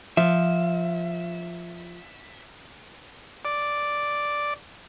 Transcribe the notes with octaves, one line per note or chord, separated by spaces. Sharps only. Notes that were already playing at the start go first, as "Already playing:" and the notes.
F3 E5
D5